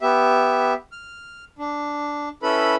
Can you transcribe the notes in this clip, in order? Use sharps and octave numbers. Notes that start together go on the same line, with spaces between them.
B3 G4 E5
F6
D4
C#4 E4 A4 B4 B5